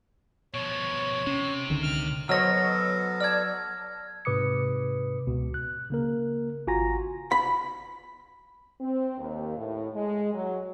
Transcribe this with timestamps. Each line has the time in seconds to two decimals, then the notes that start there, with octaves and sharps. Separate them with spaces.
0.54 B2 F3 C#5
1.27 C3 C#4
1.70 C#2 D3 D#3
1.83 F6
2.29 F#3 B3 A4 C5 C#5 D#5 F6 A#6
3.20 D5 A5 F6 G#6
4.25 G#2 C3 B4 D6 D#6 C#7
5.27 C#2 B2
5.54 F#6
5.90 C#3 A#3 A#4
6.67 G#1 F4 F#4 G#5 A#5 A#6
7.32 B5
8.80 C4
9.18 D#2
9.58 A2
9.93 G#3
10.34 F#3